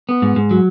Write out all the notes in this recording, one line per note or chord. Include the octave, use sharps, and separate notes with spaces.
B3
G#2
G#2
F#3